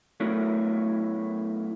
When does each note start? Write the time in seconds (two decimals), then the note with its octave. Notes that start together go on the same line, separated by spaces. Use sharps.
0.20 F#3 A3 B3 E4 A#4 C#5